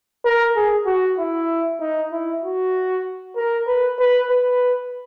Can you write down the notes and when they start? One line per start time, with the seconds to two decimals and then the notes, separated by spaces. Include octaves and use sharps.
0.25 A#4
0.56 G#4
0.86 F#4
1.18 E4
1.80 D#4
2.12 E4
2.43 F#4
3.37 A#4
3.67 B4
3.99 B4
4.30 B4